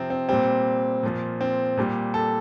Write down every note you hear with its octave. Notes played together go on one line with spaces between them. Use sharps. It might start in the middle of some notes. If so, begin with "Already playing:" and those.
Already playing: C3 F3 C4
C4
A#2 G3 C4
A#2 F3
C4
A#2 G3
A4